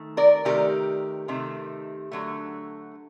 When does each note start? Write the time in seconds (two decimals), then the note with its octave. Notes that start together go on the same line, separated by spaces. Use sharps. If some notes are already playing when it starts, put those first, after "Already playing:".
Already playing: D#3 A3
0.17 A#4 D5
0.45 C3 D#3 A3 G4 A#4
1.28 C3 D#3 A3
2.11 D3 F#3 A3